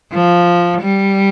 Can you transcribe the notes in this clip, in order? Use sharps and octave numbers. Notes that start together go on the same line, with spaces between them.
F3
G3